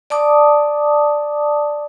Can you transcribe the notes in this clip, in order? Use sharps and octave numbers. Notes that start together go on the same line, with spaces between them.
D5 A5 D6 D#6